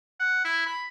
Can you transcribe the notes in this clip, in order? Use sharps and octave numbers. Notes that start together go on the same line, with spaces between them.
F#5
E4
B5